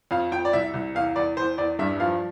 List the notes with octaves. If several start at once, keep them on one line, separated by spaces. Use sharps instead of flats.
F2 F5
F2 G5
D5
C2 E5
C2
E2 F5
E2 D5
E2 C5
E2 D5
G2 E5
F3 F5